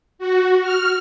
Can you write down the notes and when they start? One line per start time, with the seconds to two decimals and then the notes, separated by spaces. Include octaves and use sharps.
0.19 F#4
0.61 F6